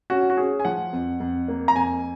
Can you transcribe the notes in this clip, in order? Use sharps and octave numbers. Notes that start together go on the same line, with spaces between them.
C#4 F#4
F#4
C#4 G#4
G#5
F3 F#5
F2
F2
A#3
A#5
F2 G#5